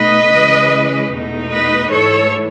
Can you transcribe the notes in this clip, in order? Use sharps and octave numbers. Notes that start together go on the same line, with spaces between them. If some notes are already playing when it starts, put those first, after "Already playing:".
Already playing: B2 A3 D#4 B4 D#5
C#3 E3 G#3
E2 B2 A3 D#4
B4 D#5
G#2 E3 A3 A4 C#5